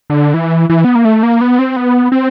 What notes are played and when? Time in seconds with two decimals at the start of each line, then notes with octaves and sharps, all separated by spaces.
0.10 D3
0.34 E3
0.69 E3
0.85 B3
0.95 A#3
1.05 A3
1.23 A#3
1.41 B3
1.59 C4
1.76 B3
2.12 C4